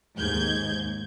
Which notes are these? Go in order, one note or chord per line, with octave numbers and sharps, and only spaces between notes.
D#2 G#2 G6 G#6